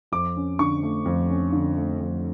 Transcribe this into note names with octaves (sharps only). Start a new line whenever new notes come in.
F2 D6
C#4
D3 C#6
A3
F2
C#4
D3
A3
F2